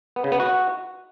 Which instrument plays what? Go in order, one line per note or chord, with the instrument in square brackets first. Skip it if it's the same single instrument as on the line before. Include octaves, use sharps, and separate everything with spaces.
[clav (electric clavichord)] B3
C#3
B3
F#4